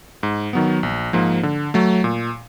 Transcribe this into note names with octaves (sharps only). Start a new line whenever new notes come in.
G#2
D#3 F#3 B3
A#1
G#2 F3 A#3
D3
F#3 A3
A#2